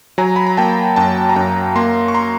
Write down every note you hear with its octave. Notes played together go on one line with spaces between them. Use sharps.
F#3 G#5 A#5
B5
A#5
A#3 G5 A5
F#2 G5 A5
A#5
F#2 G5 A5
A#3 A#5 C6
C#6
A#5 C6